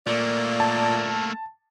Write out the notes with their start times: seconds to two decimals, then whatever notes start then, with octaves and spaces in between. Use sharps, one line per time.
0.07 A#2 A3 A#3 D5
0.60 A5